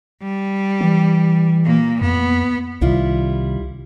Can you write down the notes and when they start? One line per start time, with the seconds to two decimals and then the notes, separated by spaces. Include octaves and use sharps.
0.22 G3
0.81 E3
1.64 A#2 A#3
2.01 F2 B3
2.81 C2 C3 D#3 G3 E4 F4